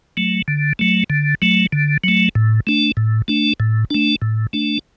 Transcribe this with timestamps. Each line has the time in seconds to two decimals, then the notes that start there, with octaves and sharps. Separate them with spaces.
0.17 F#3 A3
0.48 D3
0.79 F#3 A3
1.10 D3
1.42 F#3 A3
1.72 D3
2.04 F#3 A3
2.35 A2
2.67 A3 D4
2.97 A2
3.28 A3 D4
3.60 A2
3.90 A3 D4
4.22 A2
4.53 A3 D4